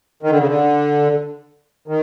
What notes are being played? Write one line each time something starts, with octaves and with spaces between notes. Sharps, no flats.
D#3
D3
C#3
D3
D#3